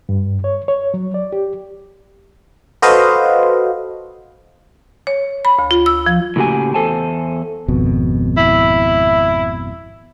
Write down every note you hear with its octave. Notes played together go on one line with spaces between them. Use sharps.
G2
C#5
C#5
F#3
D5
G4
F#4 A4 B4 C5 D#5 F5
C#5
B5
D2
F4
E6
F3
A2 C#3 A#3 F#4 G4 G#5
E2 A4 C5 G#5 A5
G#1 F2 B2
E4